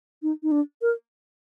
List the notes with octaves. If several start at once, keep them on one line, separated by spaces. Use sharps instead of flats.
D#4
D#4
D4
A#4